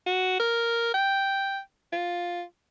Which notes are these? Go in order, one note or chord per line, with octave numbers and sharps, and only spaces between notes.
F#4
A#4
G5
F4